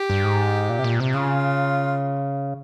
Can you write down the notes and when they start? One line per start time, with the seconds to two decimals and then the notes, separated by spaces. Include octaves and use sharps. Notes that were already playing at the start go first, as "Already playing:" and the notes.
Already playing: G4
0.10 G2
0.24 G#2
0.69 A#2
0.79 C3
0.84 A#2
1.00 C3
1.14 C#3 F4